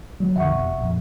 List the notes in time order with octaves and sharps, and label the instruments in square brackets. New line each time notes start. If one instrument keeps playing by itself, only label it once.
[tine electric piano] F#3 [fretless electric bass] G3
[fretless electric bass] C2 F2 D3 [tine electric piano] E5 F#5 C#6
[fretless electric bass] F1 B2
A#1 F2